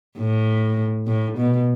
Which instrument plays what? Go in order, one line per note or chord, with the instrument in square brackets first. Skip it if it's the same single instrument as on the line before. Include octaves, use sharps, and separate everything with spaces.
[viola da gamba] A2
A2
B2